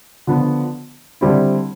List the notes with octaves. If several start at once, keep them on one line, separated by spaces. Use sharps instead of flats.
D3 F3 B3
D3 G3 C4 E4